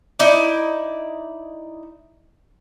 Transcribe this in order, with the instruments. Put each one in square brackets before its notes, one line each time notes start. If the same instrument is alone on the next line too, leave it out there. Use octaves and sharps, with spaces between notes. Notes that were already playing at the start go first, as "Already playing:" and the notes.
[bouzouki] D#4 E4 D5